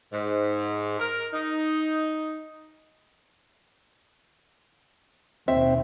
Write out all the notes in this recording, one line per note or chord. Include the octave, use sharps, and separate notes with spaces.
G#2
A#4
D#4
D#2 B2 C4 E5